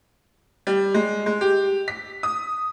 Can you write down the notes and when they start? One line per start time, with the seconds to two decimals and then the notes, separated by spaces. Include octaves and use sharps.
0.67 G3
0.94 G#3
1.26 G#3
1.41 G4
1.88 B6
2.23 D#6